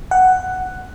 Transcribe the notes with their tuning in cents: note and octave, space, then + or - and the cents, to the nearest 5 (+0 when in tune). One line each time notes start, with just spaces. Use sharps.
F#5 +5